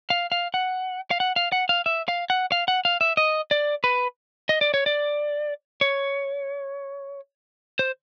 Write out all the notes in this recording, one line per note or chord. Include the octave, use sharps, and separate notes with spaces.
F5
F5
F#5
F5
F#5
F5
F#5
F5
E5
F5
F#5
F5
F#5
F5
E5
D#5
D5
B4
D#5
D5
C#5
D5
C#5
C5